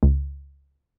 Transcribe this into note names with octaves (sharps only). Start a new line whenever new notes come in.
C#2